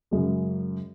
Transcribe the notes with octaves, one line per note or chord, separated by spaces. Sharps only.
F#2 C#3 G#3